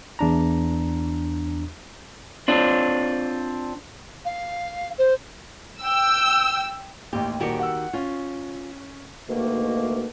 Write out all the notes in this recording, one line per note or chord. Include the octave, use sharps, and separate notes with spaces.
E2 D4 A#5
C4 D4 F4
F5
C5
G5 E6
A1 D#2 G4
D#1 D#3 F#4 G4 C#7
F#5 E6
C#4 F4
D2 G#2 B2 D#3 A3 A#3